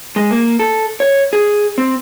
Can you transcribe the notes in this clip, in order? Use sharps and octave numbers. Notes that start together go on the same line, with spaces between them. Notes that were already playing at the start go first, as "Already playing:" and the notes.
G#3
A#3
A4
C#5
G#4
C4